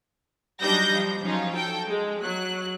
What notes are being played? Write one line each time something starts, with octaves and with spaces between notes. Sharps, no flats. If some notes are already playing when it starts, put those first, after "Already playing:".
F#3 G3 D4 D#4 G6 A#6
F3
F3 F#3 C#4 D#4 F4
A4 G5
G#3
F#3 F#6